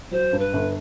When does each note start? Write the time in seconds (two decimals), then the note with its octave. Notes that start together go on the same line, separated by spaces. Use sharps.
0.11 F#3 C5
0.32 G2
0.38 B4
0.53 G1